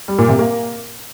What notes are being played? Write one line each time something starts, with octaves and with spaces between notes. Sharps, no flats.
G3
A#2
C3
A#3